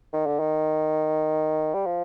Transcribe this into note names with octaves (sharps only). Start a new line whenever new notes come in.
D#3
D3
D#3
G3
F3